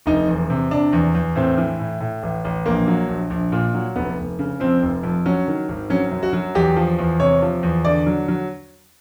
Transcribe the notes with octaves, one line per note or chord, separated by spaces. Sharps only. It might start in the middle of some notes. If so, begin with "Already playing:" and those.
F1 D#4
E2
C3
C3 D4
E2
E2
A2 C4
E3
A2
A2
A1
A1
A#1 A#3
F#3
A#1
A#1
A#2
F#3
F1 B3
F1
C#3
F2 C4
F1
F2
F#3 C#4
D#3
G#1
F#3 C#4
F#2
F#4
F#3
E2 G4
F3
E2
C3 C#5
F3
E2
D3 D5
F#3
F#3